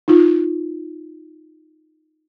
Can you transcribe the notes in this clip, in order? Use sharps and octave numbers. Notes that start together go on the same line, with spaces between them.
D#4 F4